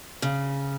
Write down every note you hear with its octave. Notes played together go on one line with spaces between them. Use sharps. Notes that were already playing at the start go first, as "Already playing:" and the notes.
C#3